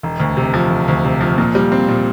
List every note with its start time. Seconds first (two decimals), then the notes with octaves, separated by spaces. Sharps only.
0.03 E1
0.20 D2
0.37 C3
0.54 F3
0.70 E1
0.88 D2
1.04 C3
1.21 F3
1.38 A#2
1.55 G3
1.72 C4
1.88 A#2